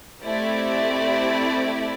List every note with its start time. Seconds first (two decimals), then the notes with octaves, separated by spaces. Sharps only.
0.25 A3 C4 E4 G4 D5